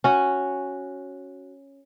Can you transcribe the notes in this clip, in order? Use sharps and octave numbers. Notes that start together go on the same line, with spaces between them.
C#4 F#4